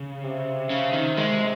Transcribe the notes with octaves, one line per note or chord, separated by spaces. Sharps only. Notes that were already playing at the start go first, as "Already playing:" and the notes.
Already playing: C#3
C3
C#3
D#3
G#3